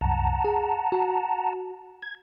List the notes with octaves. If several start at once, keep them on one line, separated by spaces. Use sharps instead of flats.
C2 F#2 F#5 A5 A#5
G#4
F#4
G#6